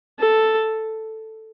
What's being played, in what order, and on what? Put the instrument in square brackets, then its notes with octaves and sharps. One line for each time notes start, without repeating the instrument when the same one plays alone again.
[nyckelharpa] A4